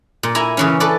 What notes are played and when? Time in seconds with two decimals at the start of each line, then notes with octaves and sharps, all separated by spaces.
0.23 A#2
0.35 E4 G#5 A#5
0.57 C#3 E3 C#4
0.80 A4 B4 D5